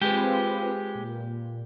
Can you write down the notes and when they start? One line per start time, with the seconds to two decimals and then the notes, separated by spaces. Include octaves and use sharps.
0.01 G#3 C4 F4 G4 B4
0.95 A#2